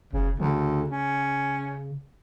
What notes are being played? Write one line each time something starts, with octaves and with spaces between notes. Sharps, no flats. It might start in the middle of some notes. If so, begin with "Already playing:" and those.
F1 C#3
D2 C#3
C#4